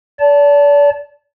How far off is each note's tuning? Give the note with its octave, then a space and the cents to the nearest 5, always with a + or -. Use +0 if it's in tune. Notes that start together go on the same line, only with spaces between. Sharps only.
D5 -35 A5 +0